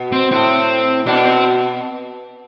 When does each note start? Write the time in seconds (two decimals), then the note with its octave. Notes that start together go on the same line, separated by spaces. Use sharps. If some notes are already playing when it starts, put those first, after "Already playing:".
Already playing: B2
0.12 C4
0.31 A2 C4
1.06 B2 D4
1.25 C4